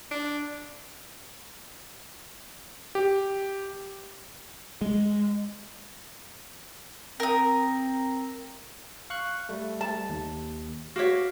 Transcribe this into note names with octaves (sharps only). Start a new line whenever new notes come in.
D4
G4
G#3
C4 A#4 D#6
F5 C#6 F#6
G3 A3
A5
D#2
F#4 C#5 F5 D6 B6